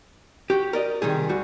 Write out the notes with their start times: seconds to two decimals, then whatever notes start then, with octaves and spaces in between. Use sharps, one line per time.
0.50 F#4 G4
0.73 A#4 D5 D#5
1.02 C3 D#3 G3 G#4
1.29 D2 G3 F#4